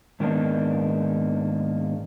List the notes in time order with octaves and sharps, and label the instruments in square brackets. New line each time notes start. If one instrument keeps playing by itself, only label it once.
[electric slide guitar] G#2 D#3 A#3 B3 D4 D#4